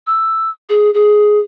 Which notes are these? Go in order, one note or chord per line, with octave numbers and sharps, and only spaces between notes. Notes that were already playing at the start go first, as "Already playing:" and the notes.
E6
G#4
G#4